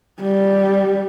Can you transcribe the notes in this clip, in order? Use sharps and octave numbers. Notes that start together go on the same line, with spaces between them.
G3